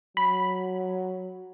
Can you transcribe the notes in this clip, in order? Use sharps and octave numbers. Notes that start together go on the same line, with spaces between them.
F#3 B5